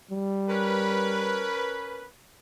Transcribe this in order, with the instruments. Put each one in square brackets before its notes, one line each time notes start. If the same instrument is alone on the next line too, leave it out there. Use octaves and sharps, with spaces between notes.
[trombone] G3
[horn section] C#4 A#4 B4